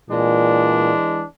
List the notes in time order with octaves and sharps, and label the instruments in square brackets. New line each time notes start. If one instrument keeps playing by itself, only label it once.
[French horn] A#2 [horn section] E3 G#3 D4